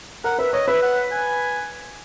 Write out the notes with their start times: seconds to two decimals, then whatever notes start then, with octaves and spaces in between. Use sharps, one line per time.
0.24 A#4 F#5
0.38 B4 E5
0.53 C#5 D#5
0.67 B4 E5
0.82 F#5
1.11 G#5